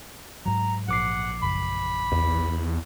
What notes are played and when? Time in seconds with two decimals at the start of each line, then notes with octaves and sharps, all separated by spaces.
0.46 G#2 F#3 A#5
0.88 A#1 F#5 D6 C7
1.43 F#1 B5
2.12 E2